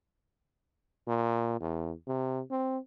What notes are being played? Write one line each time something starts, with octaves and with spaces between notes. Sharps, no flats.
A#2
E2
C3
C4